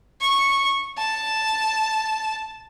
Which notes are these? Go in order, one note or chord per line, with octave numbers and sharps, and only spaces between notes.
C#6
A5